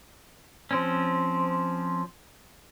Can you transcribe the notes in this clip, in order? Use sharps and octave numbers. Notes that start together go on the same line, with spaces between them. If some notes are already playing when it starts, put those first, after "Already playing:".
F3 C4 C#4